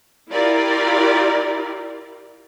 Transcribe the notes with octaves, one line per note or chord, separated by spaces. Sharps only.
E4 F4 G4 A#4 D5